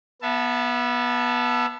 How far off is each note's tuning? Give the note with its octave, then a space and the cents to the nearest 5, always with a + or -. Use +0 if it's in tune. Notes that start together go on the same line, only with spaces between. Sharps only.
B3 -20 E5 +25 A5 +0